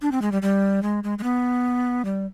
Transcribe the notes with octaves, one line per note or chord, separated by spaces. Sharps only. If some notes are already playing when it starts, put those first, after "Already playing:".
D4
C4
G#3
G3
G3
G#3
G#3
G#3
B3
G3